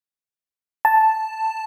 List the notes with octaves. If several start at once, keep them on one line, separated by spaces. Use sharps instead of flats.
A5